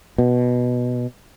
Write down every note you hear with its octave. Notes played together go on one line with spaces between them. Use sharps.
B2